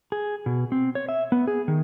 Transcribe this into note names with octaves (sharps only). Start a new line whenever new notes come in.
G#4
B2
C4
C#5
E5
B3
G#4
D#3